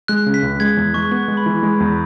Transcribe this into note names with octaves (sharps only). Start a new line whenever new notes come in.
G#3 F#6
C#3
B6
C#2
G#3 G#6
E2
G#3 C#6
B3 C#6
G#3
B5
E3
G#3
E2